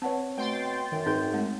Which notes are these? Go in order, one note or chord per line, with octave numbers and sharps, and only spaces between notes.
C4 B4 C#5 F#5 A5
B2 A3 G5 C6 A6
F#2 D#3
G#2 C4 D#4 G#4 B4 G6
G#3 A3 C4